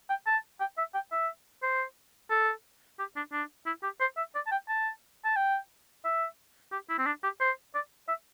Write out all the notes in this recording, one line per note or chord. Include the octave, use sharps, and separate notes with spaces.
G5
A5
G5
E5
G5
E5
C5
A4
G4
D4
D4
E4
G4
C5
E5
D5
A5
G5
A5
A5
G5
E5
G4
E4
C4
D4
G4
C5
D5
E5